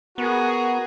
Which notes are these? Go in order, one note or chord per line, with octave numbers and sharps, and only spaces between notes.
B3 F#4 G#4 A#4